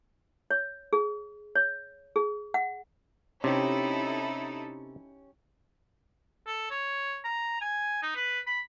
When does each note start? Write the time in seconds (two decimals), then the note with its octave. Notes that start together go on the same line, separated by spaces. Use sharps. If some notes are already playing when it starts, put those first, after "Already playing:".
0.51 C#5
0.93 G#4
1.56 C#5
2.16 G#4
2.54 F#5
3.44 C3 C#4 D#4 E4 G4 A4
6.47 A4
6.71 C#5
7.24 A#5
7.61 G#5
8.03 D#4
8.16 B4
8.47 B5